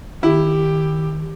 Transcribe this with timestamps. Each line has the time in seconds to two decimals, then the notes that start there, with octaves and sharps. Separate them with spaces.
0.23 D#3 E4 G4